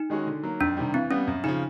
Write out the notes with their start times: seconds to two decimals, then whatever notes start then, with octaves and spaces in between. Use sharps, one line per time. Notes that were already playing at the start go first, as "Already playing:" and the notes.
Already playing: D#4
0.10 D#3 G#3 C#4 F#4
0.27 D3
0.43 F#3 A#3
0.60 F2 D4
0.77 C3 D#3 G3
0.94 E3 C4
1.11 G3 B3 C#4
1.27 F#2
1.44 C#3 F3 D#4